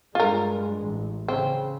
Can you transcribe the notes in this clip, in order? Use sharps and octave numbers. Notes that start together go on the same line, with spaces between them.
G2 G#3 F4 A#4
A1
C#3 C4